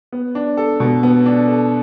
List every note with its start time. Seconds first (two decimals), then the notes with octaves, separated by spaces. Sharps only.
0.12 B3
0.35 D4
0.57 A4
0.80 B2
1.03 B3
1.26 D4
1.48 A4